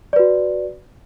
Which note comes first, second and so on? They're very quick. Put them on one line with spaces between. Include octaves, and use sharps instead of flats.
D5 B4 F#4